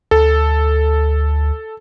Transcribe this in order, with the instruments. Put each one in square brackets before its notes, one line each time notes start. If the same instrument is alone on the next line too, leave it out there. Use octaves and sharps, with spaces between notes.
[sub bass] D2 [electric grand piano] A4